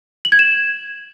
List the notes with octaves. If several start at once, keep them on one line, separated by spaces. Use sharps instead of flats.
F#7
G#6
E7